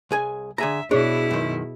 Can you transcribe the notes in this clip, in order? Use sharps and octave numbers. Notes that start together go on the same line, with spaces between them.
C2 G#4 G#5
D3 G#4 E5 A#5
B2 D4 E4 G#4 C#5
F#2 D#3